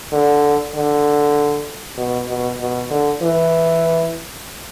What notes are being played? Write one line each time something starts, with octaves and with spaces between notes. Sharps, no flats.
D3
D3
B2
B2
B2
D3
E3